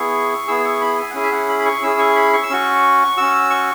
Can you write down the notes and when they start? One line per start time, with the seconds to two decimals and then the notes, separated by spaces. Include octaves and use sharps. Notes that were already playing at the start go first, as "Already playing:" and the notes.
Already playing: B3 E4 G#4 C#6
0.47 B3 E4 G#4 E6
0.64 C#6
0.81 B5
0.98 G#5
1.10 F#5
1.15 C#4 E4 G#4 G#5
1.23 E5
1.31 F#5
1.48 B5
1.59 B5
1.65 C#6
1.82 C#4 E4 G#4 E6
1.99 C#6
2.15 B5
2.33 C#6
2.43 E6
2.50 C#4 F#4 C#6
3.17 C#4 F#4 E6
3.50 C#6